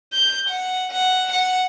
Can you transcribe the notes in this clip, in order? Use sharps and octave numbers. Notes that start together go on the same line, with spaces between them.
G6
F#5
F#5
F#5